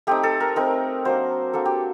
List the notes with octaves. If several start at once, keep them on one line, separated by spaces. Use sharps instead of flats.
A3 C4 D#4 G4
A4
A#4
A3 C4 D#4 A#4
F#3 A#3 D4 C5
F#3 A#3 D4 A4
G4